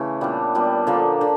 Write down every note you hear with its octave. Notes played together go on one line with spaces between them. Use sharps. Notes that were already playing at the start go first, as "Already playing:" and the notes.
Already playing: C#3 E3 A3
A#2 G3 B3 D4
A#2 G3 B3 D4
D3 F3 A#3
D3